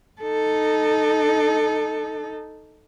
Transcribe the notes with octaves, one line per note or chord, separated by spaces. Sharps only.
D#4 A4